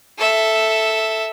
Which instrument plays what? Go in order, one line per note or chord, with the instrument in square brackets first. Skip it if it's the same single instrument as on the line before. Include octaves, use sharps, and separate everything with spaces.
[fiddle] A4 E5